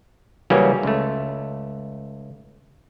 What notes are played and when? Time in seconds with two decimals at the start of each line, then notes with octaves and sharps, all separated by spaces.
0.50 C#3 E3 F#3 G3 A#3 C#4
0.83 C#2 A3